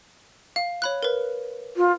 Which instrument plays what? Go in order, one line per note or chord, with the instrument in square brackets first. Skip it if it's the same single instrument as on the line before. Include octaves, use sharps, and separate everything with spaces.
[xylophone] F5
C#5 B5 F#6
A#4 B4
[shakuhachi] F4